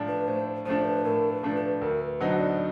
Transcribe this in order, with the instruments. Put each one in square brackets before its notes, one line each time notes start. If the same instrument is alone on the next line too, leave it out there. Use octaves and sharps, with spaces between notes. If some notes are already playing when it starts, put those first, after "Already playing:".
Already playing: [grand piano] A2 F3 A3 D4
[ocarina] B4
[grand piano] A2 [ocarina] C5
[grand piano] F3 A3 D4 [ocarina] C5
[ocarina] B4
[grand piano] A2 [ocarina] A#4
[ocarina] B4
[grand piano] F3 A3 D4
[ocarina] B4
[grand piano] D2 [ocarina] A#4
[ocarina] B4
[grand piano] D3 F#3 B3 D#4 [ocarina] C5
[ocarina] D5